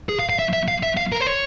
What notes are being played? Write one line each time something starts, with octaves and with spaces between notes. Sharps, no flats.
G#4
F5
F5
E5
E5
F5
E5
F5
A#4
C5
C#5